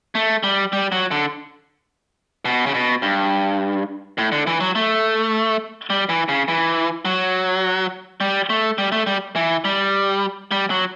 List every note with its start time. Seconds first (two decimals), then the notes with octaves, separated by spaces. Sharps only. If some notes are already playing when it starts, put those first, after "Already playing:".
0.15 A3
0.43 G3
0.73 G3
0.92 F#3
1.11 D3
2.45 B2
2.66 C#3
2.74 B2
3.02 G2
4.18 A2
4.32 D3
4.47 E3
4.60 F#3
4.75 A3
5.90 G3
6.09 E3
6.29 C#3
6.48 E3
7.05 F#3
8.21 G3
8.50 A3
8.78 G3
8.92 A3
9.07 G3
9.36 E3
9.65 G3
10.51 G3
10.70 F#3